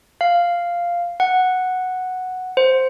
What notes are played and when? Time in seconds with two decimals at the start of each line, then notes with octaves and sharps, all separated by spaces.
0.21 F5
1.20 F#5
2.57 C5